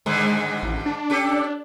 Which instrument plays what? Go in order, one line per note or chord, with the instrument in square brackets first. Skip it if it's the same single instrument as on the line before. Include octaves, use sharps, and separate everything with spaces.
[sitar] G#2 D3 D#3 [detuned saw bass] G#3
[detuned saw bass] A1
D4
[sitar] C#4 G4 A4